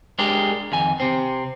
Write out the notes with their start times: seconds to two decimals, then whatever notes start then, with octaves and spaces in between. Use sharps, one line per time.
0.19 G#3 D4 G4 G#4 A#4
0.72 F2 D#3 G#5
1.00 C3 C4